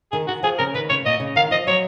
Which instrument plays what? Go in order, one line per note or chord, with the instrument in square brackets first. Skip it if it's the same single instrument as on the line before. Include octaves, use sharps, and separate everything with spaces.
[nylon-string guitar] D#3 [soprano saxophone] G#4
[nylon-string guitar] D#3 [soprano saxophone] F#4
[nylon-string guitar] F3 [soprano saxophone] G#4
[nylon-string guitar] C#3 [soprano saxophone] A#4
[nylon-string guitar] D#3 [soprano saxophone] B4
[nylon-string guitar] C#3 [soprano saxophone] C#5
[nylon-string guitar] A#2 [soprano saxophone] D#5
[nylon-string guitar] C#3
[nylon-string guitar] D#3 [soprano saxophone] F5
[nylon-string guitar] F3 [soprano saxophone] D#5
[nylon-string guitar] F#3 [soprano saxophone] C#5